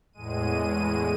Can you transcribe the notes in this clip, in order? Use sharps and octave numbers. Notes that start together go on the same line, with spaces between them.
E2 A2 G#3 D#7